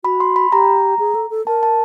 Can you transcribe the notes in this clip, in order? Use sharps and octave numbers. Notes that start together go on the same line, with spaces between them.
F#4 B5
C6
B5
G4 A#5
G#4
A4
A4
A#4 A5
A5